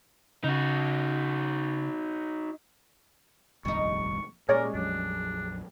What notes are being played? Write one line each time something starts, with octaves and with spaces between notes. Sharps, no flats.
C#3 D#4 F#4
F1 A#1 D#2 G3 D#4 C#6
A#2 G3 G#3 C#4 G#4 A#4 C#5 D5
A#1 F2 F#3 D4